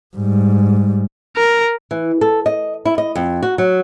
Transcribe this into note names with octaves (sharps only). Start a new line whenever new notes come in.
G#2 G3
A#4
E3
A4
D#5
E4
D#5
F2
F#4
F#3